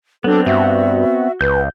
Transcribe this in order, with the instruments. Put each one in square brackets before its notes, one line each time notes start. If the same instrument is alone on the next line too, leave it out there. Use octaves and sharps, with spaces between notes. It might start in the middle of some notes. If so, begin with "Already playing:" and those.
[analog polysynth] F#3 D4 [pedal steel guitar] B3 C4 [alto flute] A4
[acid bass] G2 [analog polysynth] F#4 [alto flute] E5
[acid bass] C#2 [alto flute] B4 [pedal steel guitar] G6